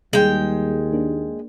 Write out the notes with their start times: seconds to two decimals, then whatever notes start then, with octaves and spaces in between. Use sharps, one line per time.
0.13 D#2 G3 G#3 G5
0.93 A#3 D4